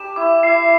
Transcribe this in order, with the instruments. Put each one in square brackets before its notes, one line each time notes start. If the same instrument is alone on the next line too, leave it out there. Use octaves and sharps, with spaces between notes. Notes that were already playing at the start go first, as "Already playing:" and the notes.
Already playing: [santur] D4 G4 B4 [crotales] E7
[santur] E4 [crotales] D6
[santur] E4 [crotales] C7